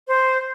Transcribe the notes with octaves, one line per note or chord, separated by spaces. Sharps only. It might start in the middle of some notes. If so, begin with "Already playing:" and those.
C5